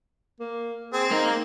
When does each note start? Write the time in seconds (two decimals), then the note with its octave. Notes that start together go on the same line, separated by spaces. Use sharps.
0.40 A#3
0.93 C4 G#4
1.11 A#3 D#4 A#4